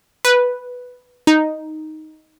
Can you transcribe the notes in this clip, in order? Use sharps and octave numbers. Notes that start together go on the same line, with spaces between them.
B4
D#4